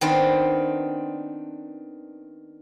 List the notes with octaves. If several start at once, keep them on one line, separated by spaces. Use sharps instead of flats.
D#3 B3 C4 D4